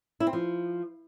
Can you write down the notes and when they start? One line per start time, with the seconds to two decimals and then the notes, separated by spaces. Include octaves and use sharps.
0.20 E4
0.27 C4
0.33 F3